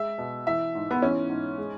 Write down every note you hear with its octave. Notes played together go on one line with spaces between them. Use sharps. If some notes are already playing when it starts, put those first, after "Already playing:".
Already playing: G#3 E5
B2
E3 E5
G#2
B3
E3 C#4
G#2
G#3